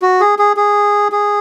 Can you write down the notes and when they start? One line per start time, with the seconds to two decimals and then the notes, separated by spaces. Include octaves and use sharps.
0.02 F#4
0.20 G#4
0.39 G#4
0.57 G#4
1.12 G#4